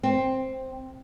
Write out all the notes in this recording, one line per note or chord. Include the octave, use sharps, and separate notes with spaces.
C4